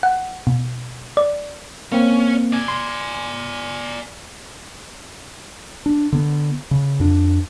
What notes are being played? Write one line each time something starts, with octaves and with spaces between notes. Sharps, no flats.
F#5
B2
D5
A#3 C4 C#4
D5 G#5
C6
D4
D3 B3
C#3
F2 D4